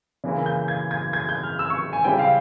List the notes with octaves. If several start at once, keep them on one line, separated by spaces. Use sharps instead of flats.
C#3 E3 A#3 E4
G6
G#6
G#6
G#6
G6
F6
E6
C#6
G#5
C#3 G3 C4 E4 G5
F5